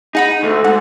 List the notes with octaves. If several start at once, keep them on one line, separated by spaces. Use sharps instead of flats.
D#4 G#4 F#5 B5
D2 A4
G#2 F#5